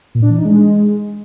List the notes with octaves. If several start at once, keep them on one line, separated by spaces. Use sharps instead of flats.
A#2
D4
E3
D#4
G#3